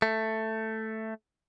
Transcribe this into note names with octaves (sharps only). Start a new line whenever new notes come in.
A3